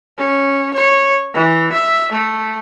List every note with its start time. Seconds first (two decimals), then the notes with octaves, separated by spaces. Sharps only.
0.18 C#4
0.74 C#5
1.34 E3
1.72 E5
2.12 A3